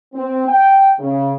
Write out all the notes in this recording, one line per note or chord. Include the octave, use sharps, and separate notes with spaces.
C4
G5
C#3